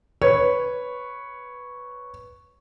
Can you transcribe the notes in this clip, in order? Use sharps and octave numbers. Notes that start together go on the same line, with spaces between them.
B4 C#5